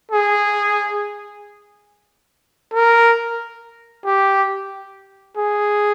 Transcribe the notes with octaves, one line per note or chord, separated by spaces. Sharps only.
G#4
A#4
G4
G#4